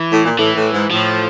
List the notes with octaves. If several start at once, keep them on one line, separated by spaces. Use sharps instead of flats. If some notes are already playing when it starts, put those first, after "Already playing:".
Already playing: E3
A2
A#2
A2 E3
A2
G#2
A2 F3